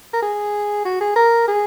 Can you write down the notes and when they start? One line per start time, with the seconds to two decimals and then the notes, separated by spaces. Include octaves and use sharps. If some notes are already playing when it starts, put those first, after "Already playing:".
0.14 A#4
0.22 G#4
0.85 F#4
1.01 G#4
1.16 A#4
1.48 G#4